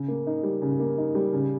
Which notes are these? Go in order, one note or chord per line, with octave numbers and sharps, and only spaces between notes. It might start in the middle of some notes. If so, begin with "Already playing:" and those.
Already playing: C#3
A#3
D#4
G3
C#3
A#3
D#4
G3
C#3